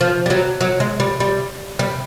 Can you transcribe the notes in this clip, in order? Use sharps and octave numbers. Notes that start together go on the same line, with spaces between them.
F3
G3
F#3
F#3
G#3
G3
G3
G3